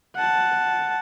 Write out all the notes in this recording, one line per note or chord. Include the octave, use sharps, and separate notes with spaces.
F#5 A5